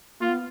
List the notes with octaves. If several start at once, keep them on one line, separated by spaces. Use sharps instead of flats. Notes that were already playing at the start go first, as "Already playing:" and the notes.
A#3 F4
B3